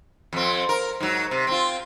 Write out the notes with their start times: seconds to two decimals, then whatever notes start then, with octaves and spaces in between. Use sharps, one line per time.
0.33 F2 C4
0.69 A#4
1.00 G#2 F#3
1.31 C3
1.47 C4 F4